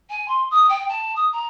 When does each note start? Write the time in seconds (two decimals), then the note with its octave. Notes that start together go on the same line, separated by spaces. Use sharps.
0.09 G#5
0.28 C6
0.50 D#6
0.69 G5
0.89 A5
1.16 D#6
1.32 A#5